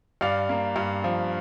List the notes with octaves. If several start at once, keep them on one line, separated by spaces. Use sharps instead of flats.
G2 D5 F5
A#3
G2
F3